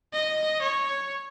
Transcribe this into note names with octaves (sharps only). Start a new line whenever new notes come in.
D#5
C#5